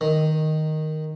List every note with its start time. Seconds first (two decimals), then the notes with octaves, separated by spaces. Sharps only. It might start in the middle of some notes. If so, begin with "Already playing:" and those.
0.01 D#3